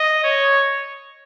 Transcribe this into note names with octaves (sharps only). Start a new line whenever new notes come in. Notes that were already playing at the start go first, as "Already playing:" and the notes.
Already playing: D#5
C#5